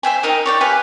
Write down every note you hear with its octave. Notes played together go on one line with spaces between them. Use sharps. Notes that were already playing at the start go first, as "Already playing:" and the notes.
C5 E5 G5 G#5
D#4 A#4 D#5
C#5 D5 G5
G4 B4 F5 G#5